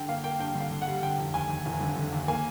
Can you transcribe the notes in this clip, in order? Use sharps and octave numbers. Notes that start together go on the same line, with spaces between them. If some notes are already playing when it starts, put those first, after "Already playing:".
Already playing: G2 D3 G5
A#3 F5
A#3 G5
G2 G5
D3
F5
D3
F#5
G3
D3 G5
F1
D#2 G#5
D#2
F1
D3
D3
D#2
A#3 G#5